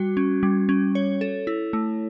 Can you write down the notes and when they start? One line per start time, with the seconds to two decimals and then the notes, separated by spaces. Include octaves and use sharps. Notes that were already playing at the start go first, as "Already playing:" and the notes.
Already playing: G3 F#4
0.17 C#4
0.43 G3
0.69 C#4
0.95 C#5
1.21 A4
1.47 E4
1.73 A3